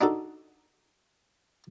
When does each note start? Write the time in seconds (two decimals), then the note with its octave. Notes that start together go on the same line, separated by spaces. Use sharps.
0.01 D4 D#4 F#4 A4